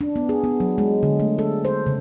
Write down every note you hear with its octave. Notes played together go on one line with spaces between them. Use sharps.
D4
B3
G#4
B3
F#3
G#3
D3
A3
A4
C5
C#3